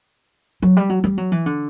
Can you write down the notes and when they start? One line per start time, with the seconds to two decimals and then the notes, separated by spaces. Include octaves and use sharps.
0.62 F#3
0.77 G3
0.90 F#3
1.04 G3
1.18 F#3
1.32 E3
1.46 D3